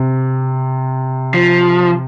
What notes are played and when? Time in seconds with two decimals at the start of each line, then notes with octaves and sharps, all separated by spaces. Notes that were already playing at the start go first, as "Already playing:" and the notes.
Already playing: C3
1.34 F3